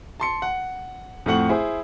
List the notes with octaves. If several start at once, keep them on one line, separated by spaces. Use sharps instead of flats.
A5 C6 C#7
F#5
F2 A2 A3 F#5 C#6 F#7
E4 G#4 C5